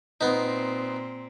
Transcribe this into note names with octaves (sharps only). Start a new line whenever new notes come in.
A#2 B3 C4 D#4